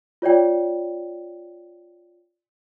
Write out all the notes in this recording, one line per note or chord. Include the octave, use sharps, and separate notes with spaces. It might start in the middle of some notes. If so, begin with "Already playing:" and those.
F4 C#5 D5 G5